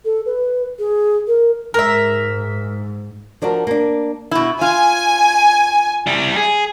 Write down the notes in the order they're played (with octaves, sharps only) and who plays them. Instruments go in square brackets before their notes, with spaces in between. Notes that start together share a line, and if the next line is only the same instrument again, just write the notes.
[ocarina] A4
B4
G#4
A#4
[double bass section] G#2 [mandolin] A#4 E5
[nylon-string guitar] F3 D4 F#4 A#4
A#3 D4
[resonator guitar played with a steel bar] B2 E4
[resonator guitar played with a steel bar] F4 [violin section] G#5
[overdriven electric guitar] G3 E4
G#4